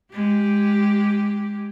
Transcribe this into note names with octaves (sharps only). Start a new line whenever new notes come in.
G#3 G4